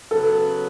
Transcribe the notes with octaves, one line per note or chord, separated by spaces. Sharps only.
C#3 F#3 B3 A4